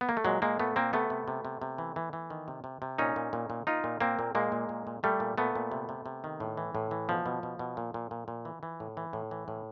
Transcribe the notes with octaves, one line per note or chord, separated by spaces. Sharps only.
B3
A#3
A3
A#2 F#3 G#3
A#2 G#3 A#3
A#2 A3 B3
A#2 A#3 C4
C3 A3 B3
C3
C3
C3
C3
E3
E3
E3
D#3
C3
C3
C3
A#2 C#4 D#4
A#2
A#2
A#2
A#2 D#4 F4
A#2
A#2 A#3 C4
A#2
A#2 G#3 A#3
A#2
A#2
A#2
A#2 G3 A3
A#2
A#2 A3 B3
A#2
C3
C3
C3
D#3
A2
E3
A2
E3
B2 F3
B2
B2
B2
A#2
A#2
A#2
A#2
E3
E3
A2
E3
A2
E3
A2